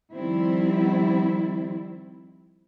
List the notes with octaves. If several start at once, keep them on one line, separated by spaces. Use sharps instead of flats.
D#3 F3 G3 C4 E4